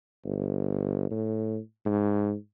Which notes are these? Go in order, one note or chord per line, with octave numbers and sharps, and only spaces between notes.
G1
A2
G#2